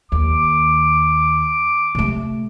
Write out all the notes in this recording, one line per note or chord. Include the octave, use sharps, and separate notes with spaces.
D#2 D6
C3 A3